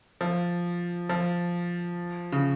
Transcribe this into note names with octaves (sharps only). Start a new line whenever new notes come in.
F3
F3
C#3